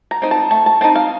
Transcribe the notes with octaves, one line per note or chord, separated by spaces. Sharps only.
A#5
C4 D#4
A5
A3 A5
A5
C4 D#4 A5
F5